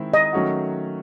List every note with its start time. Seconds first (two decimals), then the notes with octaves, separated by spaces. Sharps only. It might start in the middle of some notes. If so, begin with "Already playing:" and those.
Already playing: D#3 G#3 C4 E4
0.14 D#5
0.33 D#3 F#3 A3 C#4 F#4